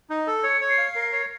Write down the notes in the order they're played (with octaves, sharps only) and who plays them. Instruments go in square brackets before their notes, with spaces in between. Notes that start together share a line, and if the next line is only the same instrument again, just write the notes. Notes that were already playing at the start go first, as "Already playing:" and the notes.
[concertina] D#4
A4
[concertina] C#5 [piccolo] C#7
[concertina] C#5
[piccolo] C7
[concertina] F5
A#4
C#5